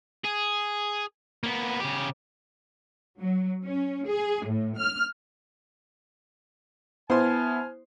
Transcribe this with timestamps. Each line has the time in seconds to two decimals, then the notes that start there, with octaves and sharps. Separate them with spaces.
0.25 G#4
1.44 A#3 B3
1.80 C#3 G4
3.20 F#3
3.64 C#4
4.08 G#4
4.46 A2
4.78 F6
7.10 B3 E4 C5 G#5 A5 C6 F6